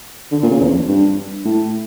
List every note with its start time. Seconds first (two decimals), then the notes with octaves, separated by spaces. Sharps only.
0.32 D3
0.43 A#2
0.51 C#3
0.61 E2
0.69 F2
0.88 G2
1.45 A2